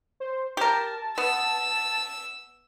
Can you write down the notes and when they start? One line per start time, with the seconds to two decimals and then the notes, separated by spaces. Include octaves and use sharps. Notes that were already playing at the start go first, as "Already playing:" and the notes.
0.20 C5
0.57 G4 A#4 A5
1.18 B3 E6